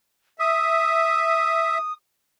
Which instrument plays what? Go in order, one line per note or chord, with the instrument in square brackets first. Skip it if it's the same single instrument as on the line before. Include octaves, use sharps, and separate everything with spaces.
[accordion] E5 [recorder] D#6